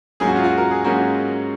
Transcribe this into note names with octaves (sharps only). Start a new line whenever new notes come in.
G#2 F#3 A#3 C#4 G#4
F#4
F4
F#4
A#4
G#4
G#2 F#3 A#3 C#4 F#4